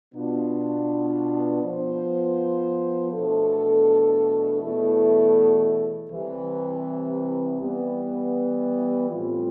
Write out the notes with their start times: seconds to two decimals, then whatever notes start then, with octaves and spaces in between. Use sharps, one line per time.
0.15 B2 B3 D4 F4
1.64 F3 B3 F4 C5
3.13 E2 B2 A3 D4 A4
4.62 E2 B2 A3 E4 A4
6.11 C2 C3 E3
7.60 E3 G3 B3
9.09 A2 G3 C4 F4